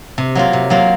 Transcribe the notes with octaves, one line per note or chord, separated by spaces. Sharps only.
C3
F#3 A#3 F4
C3
F#3 A#3 F4